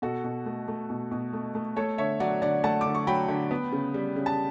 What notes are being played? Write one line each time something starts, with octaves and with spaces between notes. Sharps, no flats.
B2 F#4 A4
B2
A3
A3
B2
B2
A3
A3
A3 A4 C#5
D3 C#5 E5
F#3 D5 F#5
D3 D5 F#5
A3 F#5 A5
D3 D6
C#6
F#3 G5 B5
D3
B3
C#3
G3
C#3
A5